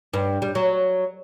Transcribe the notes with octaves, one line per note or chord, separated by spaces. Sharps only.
G2
G3
F#3